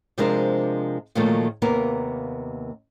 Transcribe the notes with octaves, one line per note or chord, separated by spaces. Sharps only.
C3 F3 G#3 D4 A#4 C5
A#2 D#3 F3 F#3 A3 A#3
D#2 C3 A#3 B3 A#4